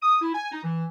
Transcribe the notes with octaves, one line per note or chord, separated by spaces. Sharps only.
D#6
E4
G#5
D#4
E3